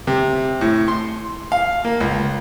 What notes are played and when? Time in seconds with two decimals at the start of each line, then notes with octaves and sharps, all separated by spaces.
0.07 C3
0.61 A2
0.88 C6
1.52 F5
1.85 A#3
2.00 C#2